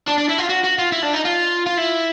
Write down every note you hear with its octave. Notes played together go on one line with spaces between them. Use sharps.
D4
D4
E4
F4
F#4
F#4
F4
E4
D4
D#4
F4
F4
E4